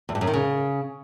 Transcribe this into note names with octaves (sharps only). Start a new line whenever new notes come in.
E2
G2
F#2
D#3
C#3